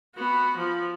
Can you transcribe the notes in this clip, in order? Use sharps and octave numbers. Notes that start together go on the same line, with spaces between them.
B3 F#4
F3